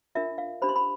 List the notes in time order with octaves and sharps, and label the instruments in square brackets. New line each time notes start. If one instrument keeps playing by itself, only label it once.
[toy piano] D4 F4 A#4 E5
F5
D4 G4 C5 B5
C6
B5